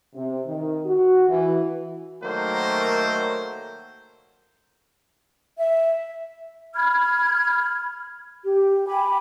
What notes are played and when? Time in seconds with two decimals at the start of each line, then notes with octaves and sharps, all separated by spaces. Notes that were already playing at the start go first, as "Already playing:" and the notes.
0.15 C3
0.46 D#3
0.85 F#4
1.29 E3
2.22 D#3 F#3 A3 A#3 C5
5.58 E5
6.74 B5 F6 G#6
8.44 G4
8.87 G5 G#5 B5 D6